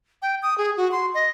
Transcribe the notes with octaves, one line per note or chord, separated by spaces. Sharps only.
G5
D#6
G#4
F#4
C6
D#5